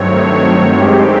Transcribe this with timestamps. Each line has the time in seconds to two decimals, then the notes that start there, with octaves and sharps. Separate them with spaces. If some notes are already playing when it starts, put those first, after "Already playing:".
Already playing: G2 D#3 F#3 A3 C4 C#5
0.77 G2 D#3 G#3 C4 G4